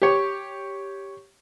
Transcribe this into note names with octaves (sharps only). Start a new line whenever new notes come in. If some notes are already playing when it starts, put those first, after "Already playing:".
G4 C#5